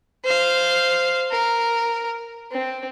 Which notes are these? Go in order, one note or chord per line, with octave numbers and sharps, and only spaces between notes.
C5 F5
A#4
C4